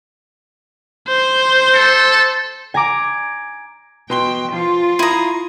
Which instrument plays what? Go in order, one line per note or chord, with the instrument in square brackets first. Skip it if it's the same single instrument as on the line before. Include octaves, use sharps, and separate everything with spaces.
[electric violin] C5
[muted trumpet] A4
[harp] G#5 A#5 D6
[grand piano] B2 C6 G7 [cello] G5
[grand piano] F3 [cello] F4
[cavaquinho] E4 A#5 [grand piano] D#6 D#7